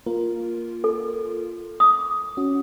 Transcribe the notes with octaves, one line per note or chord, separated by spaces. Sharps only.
A#3 F4 A#4
A4
D6 D#6
C#4 F#4